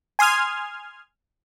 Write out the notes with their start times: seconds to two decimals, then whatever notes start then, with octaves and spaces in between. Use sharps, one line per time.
0.19 G#5 C6 D#6 F6 G#6